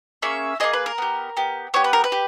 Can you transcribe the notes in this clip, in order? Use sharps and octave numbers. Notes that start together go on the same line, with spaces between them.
A#3 C#4 G#4 E5
A#3 C#4 G#4 D#5
B4
A#4
B3 G4
B3 G4
B3 G4 C#5
B4
A#4
B4
G4